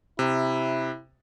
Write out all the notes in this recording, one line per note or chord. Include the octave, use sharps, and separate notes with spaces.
C3 E4